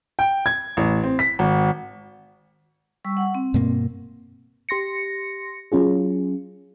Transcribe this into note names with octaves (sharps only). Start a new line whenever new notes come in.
G5
G#6
A1
C4
B6
G#1
G3 C#6 E6
F#5
C4
G2 B2 A#3
G4 C6 A#6 C#7
F#3 C#4 F4 G#4